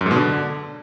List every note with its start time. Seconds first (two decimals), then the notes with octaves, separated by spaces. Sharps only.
0.01 F#2
0.06 G#2
0.11 B2
0.16 D3